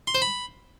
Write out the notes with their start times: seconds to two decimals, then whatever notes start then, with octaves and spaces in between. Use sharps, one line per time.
0.07 C6
0.15 C5
0.22 B5